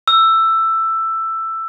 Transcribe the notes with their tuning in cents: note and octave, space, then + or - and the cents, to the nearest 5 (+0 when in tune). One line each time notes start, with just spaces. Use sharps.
E6 +10